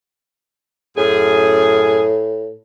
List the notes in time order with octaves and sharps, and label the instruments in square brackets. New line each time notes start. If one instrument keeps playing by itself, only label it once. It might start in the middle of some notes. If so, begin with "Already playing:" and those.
[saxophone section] F#2 G#4 [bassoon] A2